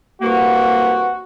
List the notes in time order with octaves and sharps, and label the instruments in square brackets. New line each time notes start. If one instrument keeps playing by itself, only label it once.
[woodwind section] C2 G2 A#3 [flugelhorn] F#4